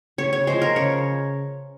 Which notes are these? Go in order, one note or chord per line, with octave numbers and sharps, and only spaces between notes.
C#3 C#5
C#5
F3 G#3 C5
A#4
C#3 C#5